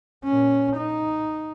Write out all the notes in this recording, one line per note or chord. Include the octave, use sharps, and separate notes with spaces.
A#2 C#4
D#4